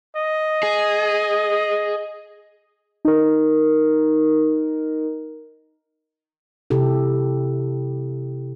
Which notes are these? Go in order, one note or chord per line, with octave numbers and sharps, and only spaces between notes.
D#5
G#4
D#4 A#4
C3 E4 G4 A4